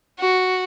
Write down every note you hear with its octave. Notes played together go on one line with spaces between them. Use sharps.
F#4